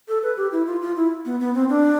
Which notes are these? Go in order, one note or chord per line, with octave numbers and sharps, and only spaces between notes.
A4
B4
G4
E4
F4
F4
E4
B3
B3
C4
D4